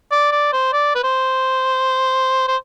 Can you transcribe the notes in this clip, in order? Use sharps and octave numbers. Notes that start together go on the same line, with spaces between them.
D5
D5
C5
D5
B4
C5
C5